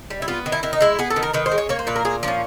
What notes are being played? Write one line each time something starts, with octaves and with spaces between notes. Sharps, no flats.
G3
E4
B3 F4
D#3
E4
D#3 E4
D#4
G#3 E4
B3 G#4
A4
D#3
A#4
D#3 B4
C5
G#3
C#5
A#3 C#5
C5
A#2 B4
A#4
A#2 G#4
F3 C#4 D4